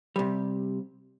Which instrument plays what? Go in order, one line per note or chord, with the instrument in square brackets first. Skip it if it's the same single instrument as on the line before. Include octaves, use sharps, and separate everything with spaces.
[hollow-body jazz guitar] C3 G3